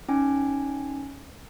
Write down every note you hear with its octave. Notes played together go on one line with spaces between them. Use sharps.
C#4 D#4 G#5